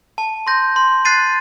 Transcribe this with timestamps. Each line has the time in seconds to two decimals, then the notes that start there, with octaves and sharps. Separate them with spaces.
0.18 A5
0.47 C6 G6 A#6
0.76 C6
1.05 F#6 A6 C7 D#7